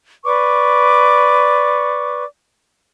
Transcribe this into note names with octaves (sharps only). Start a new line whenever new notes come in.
B4 D5 C#6 D6